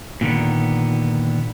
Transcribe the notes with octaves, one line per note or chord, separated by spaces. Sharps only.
A#2 D3 D#3 B3